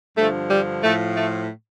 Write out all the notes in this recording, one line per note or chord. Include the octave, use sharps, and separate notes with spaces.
G2 D3 F3 A3
G3
A2 F3 A3
A3